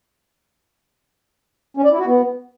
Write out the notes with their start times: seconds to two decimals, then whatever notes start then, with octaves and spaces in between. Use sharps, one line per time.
1.77 C#4
1.84 D5
1.92 E4
1.99 F#4
2.06 B3